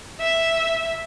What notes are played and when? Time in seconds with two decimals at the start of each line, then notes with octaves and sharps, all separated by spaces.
0.21 E5